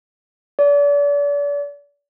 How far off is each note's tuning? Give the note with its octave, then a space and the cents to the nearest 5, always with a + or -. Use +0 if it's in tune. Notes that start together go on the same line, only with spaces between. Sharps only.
D5 -40